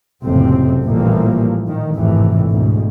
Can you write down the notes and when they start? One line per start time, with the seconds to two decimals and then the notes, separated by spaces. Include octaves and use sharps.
0.25 F#1 F2 A2 C3 C4
0.83 A1 A#2 E3 F3 G3 A#3
1.67 A#2 D#3
1.96 G#1 F2 A2 C3 E3
2.50 D2 G#2 B2